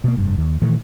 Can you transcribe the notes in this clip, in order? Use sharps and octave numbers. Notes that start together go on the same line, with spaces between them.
B2 A#3
F1 G2
D#2
A#2 D#3 E3 A3